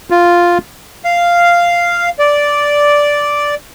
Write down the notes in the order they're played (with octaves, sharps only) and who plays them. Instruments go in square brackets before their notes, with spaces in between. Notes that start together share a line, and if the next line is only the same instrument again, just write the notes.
[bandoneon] F4
[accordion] F5
D5